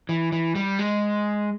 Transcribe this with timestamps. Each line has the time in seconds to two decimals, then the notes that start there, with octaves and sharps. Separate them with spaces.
0.09 E3
0.32 E3
0.55 G3
0.79 G#3